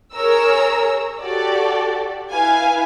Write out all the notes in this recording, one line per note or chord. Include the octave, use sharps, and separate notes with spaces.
G#4 A#4 C#5 A#5 E6
F#4 G4 A4 D5
E4 B4 F5 G#5